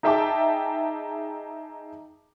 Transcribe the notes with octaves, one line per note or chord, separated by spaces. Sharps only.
D#4 G#4 E5 G5 A5 D6